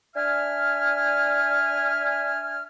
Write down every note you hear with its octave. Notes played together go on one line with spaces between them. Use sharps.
D4 E5 G#5 F6